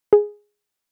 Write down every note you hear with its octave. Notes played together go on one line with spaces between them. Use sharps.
G#4